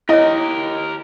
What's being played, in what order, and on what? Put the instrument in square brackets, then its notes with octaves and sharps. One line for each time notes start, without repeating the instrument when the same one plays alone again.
[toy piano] E4 C#5 [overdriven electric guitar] G4 A#4 [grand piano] D#5